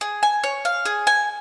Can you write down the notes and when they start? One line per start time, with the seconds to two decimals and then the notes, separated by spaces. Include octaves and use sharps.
0.01 G#4
0.23 G#5
0.44 C#5
0.65 F5
0.85 G#4
1.07 G#5